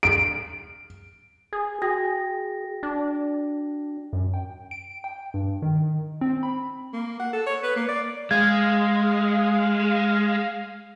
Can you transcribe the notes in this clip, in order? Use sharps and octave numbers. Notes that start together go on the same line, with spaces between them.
D7
G#4
F#4 G#4 G5 A#6
D4
F#2
G5
D7
G5
G2
D#3
C4
B5
A#3
F#5
A4
C#5
B4
A#3
D5
G#3 F5 G#6